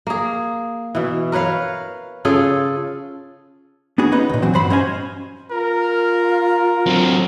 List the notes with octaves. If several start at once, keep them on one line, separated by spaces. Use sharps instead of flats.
A#3 G#4
B2 E3
A#4 B4 C#5 F5
C#3 F4 G#4 A4
B3 D4 F#4 G#4
C#4 D#4 B4
D#2 A#2
E3 F#3 C4 F#4
G2 F#3 C5 B5 C6
C#4 C5 D#5 F5 G#5
F4 A#4
F#3 C4